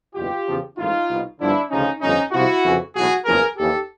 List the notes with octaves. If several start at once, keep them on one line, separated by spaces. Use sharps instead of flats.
F#1 E2 B2 F4 G4
E2 C#3 F3
A1 G#2 D#3 D#4 F4
C2 B2
G1 G2 D3 F3 D4 E4
D2 C#3 F3 C#4 D#4
G1 F2 C#3 C#4 D#4
C2 C3 F3 E4 F#4
F2 C#3 E3
B1 A2 E3 F#4 G#4
F#1 E2 C#3 F3 G#4 A#4
D#2 C#3 E3 G4 A4